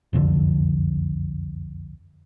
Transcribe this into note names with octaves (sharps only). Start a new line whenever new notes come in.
F#1 C2 F2 D3